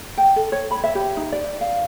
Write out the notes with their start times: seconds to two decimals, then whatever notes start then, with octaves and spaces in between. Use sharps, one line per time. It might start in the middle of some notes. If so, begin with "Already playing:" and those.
0.17 G5
0.36 A4
0.52 C#5
0.71 B5
0.84 E5
0.95 G4
1.17 D#4
1.32 D5
1.61 F5